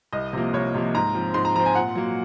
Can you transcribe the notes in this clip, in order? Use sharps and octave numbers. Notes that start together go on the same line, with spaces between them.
C2 D#5
C3 F3 A#3
C2 C#5
C3 F3 A#3
G#2 A#5
F3 C4
G#2 C6
A#5
F3 C4 A#5
G#5
A#2 F#5
F#3 A#3